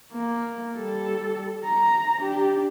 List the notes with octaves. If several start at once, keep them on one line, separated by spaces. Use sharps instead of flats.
A#3
G3 A4
A#5
D4 G4